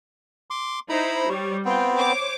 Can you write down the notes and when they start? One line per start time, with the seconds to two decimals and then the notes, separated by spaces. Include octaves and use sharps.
0.50 C6 D6
0.89 D#4 E4 C5 A#5 B5
1.29 G3 C#5
1.65 B3 C4 F4 G5
1.96 C5 C#5 D6